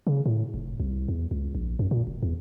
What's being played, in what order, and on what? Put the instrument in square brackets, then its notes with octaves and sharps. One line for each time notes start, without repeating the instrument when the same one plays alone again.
[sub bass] C#3
A2
F1
C2
E2
C#2
A#1
F#2
A#2
F1
E2